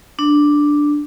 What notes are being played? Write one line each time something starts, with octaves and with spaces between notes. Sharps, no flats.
D4